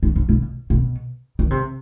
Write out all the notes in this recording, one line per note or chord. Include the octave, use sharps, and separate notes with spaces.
D#3
C3
B2
B2
D#3
C3